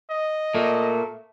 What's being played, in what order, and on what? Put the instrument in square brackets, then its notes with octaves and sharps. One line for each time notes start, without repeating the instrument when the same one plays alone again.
[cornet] D#5
[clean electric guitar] A#2 A#3 [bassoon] A3